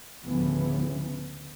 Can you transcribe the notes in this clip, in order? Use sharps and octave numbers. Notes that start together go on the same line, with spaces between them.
D2 A2 C#3 E3 F3 B3